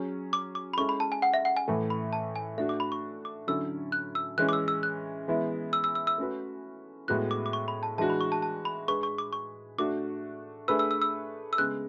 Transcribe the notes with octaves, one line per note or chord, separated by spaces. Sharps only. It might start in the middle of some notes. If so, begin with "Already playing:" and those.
Already playing: F#3 C#4 G#4
D6
D6
B5
G#3 C#4 E4 A4 C#6
B5
A5
G#5
F#5
E5
F#5
G#5
A2 E3 A3
B5
A5
G#5
A3 D4 F#4 E5
D6
B5
C#6
D6
D3 F#3 C#4 E4 A4 E6
F#6
E6
E3 G#3 C#4 F#6
D6
E6
E6
F#6
E3 G#3 B3 E4
E6
E6
E6
E6
A3 C#4 F#4 B4
A2 G#3 B3 F#4 F#6
D6
D6
C#6
B5
A5
E3 G#3 D4 F#4 A5
B5
C#6
A5
A5
B5
G#3 D4 G#4 B4 C#6
C#6
D6
C#6
A3 D4 F#4 D6
A3 D4 G#4 B4 E6
E6
E6
E6
E6
C#3 G#3 B3 F#6